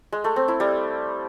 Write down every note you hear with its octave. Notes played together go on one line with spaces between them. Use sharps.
G#3
A3
C4
E4
G3